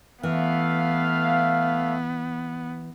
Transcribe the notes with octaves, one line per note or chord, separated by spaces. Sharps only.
E3 A3 B3 E5 F5